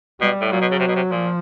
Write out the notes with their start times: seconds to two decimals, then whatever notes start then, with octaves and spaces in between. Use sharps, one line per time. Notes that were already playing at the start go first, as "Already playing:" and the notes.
0.21 B2 G3
0.41 A2
0.51 A#2 F#3
0.61 B2
0.71 C#3
0.79 C3
0.88 B2
0.96 C3
1.11 A#2 F3